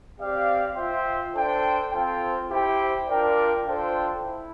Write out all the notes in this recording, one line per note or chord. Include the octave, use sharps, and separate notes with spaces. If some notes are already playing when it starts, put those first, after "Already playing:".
C4 G4 D5 F5
F4 C5 E5 G5
D4 A4 C5 G5
C4 F4 A4 C5 G5
E4 G4 C5 G5
D4 F4 A#4 D5 G5
D4 F4 A4 C5 G5
E4